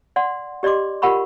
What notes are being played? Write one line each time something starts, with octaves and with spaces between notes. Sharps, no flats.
D5 F#5 C6
G4 D5 D#5 C6 D6
F4 G4 A#4 F#5 B5 C#6